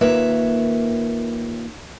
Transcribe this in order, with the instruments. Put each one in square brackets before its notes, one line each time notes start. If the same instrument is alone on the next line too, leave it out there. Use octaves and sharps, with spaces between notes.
[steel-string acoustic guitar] D#2 A#3 F4 B4 C#5 E5